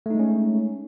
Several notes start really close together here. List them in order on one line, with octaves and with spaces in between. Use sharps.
A3 D#4 G#3 C#4